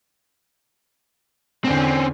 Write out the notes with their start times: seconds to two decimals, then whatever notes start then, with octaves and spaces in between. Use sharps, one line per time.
1.65 E2 D3 C4 C#4